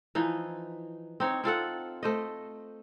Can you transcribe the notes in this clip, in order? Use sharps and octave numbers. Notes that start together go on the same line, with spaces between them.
E3 F3 D#4
C4 D#4 C#5
C4 F4 A4 F#5
A3 C5 D#5